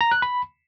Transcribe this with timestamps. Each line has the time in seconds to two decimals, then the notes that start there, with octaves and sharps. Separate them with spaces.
0.01 A#5
0.11 F#6
0.22 B5